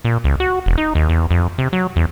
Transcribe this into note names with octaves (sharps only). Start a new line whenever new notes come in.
A#2
C#2
F#4
E1
D#4
D#2
E2
F2
C3
F#3
E2